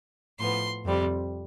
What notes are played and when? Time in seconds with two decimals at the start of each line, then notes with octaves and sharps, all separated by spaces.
0.39 A2 F3 B3 C6
0.86 F2 C3 G3